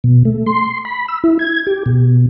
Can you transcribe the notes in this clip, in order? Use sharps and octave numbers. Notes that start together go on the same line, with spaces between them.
B2
A3
C6
B5
E6
E4
G#6
G4
B2